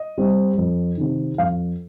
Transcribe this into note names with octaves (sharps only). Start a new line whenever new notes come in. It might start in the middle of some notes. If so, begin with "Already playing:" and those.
Already playing: D#5
G3 C4
F2
C3 D#3
F2 F5